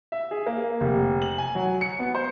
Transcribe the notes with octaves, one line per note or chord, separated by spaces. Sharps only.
E5
G#4
A#3
F1
F#7
G#5
F#3
C#7
B3
C5